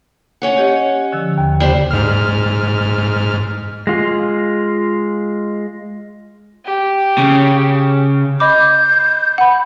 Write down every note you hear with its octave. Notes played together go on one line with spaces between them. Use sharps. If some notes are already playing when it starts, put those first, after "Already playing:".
C#4 C#5 F#5
G4 D#5
D3 F3 E6
D#2
C#3 D4 G4 C5
G#2 F6
G#3 F4
G4
C#3
D#5 B5 D6 G6
F#5 B5